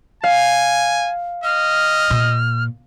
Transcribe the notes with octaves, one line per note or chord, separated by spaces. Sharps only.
F5 G#5
D#5 F6
A#2